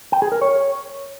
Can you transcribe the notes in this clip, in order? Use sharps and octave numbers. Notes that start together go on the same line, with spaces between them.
G5
G#4
A#4
C#5